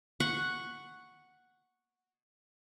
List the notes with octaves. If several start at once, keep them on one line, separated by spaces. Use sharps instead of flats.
F#5 C#6